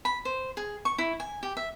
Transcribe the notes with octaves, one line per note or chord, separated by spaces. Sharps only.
B5
C5
G#4
C#6
E4
G#5
G4
E5